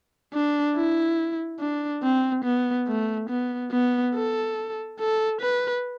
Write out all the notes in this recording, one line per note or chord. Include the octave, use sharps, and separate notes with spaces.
D4
E4
D4
C4
B3
A3
B3
B3
A4
A4
B4